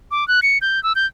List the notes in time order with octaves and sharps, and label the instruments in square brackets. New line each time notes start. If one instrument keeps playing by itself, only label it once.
[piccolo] D6
F#6
C#7
G6
E6
G6